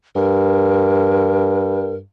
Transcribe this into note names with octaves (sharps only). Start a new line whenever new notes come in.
G2 A#4